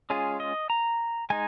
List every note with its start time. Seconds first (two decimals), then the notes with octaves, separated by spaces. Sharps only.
0.10 G#3 C#4 F4 G#4
0.40 D#5
0.70 A#5
1.30 G#3 D#4 G#5